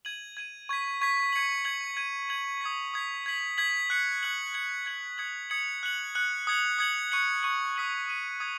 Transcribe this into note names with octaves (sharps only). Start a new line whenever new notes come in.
G#6 D#7 F#7
G#6 D#7 F#7
C#6 G#6 B6
C#6 G#6 B6
G#6 C#7 F#7
G#6 C#7 F#7
G#6 D#7 F#7
G#6 D#7 F#7
D#6 G#6 B6
D#6 G#6 B6
G#6 B6 F#7
G#6 B6 F#7
F#6 C#7 F#7
F#6 C#7 F#7
G#6 C#7 F#7
G#6 C#7 F#7
D#6 G#6 C#7 F#7
D#6 G#6 C#7 F#7
F#6 C#7 F#7
F#6 C#7 F#7
D#6 G#6 C#7 F#7
D#6 G#6 C#7 F#7
C#6 F#6 C#7 F#7
C#6 F#6 C#7 F#7
D#6 B6 D#7 F#7
D#6 B6 D#7 F#7
D#6 G#6